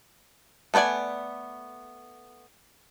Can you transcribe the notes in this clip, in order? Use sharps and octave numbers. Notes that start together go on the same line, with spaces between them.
A3 B3 C5 D5 G#5